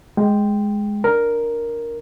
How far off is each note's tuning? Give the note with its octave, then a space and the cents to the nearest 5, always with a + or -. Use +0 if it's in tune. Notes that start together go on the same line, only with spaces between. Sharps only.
G#3 +0 G5 +0
D4 +5 A#4 +0